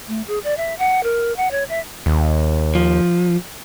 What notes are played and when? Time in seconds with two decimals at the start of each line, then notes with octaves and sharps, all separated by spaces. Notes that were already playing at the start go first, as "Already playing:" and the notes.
0.08 A3
0.27 G#4
0.44 D5
0.57 E5
0.78 F#5
1.03 A#4
1.36 F#5
1.51 C#5
1.69 E5
2.06 D#2
2.75 F3